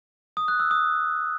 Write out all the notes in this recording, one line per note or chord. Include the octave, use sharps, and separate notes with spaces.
D#6
F#6
E6
D#6